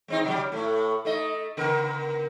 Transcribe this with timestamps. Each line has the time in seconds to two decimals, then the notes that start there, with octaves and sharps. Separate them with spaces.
0.08 G#3 C4 D#4
0.24 C3 F#3 G3
0.52 A2 A3
1.05 A3 D#4 D#5
1.57 C#3 B3 A#4